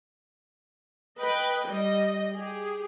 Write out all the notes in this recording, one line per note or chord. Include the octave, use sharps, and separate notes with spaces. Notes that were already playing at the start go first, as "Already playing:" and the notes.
B4 D#5 G5
G3 D#5
G4 G#4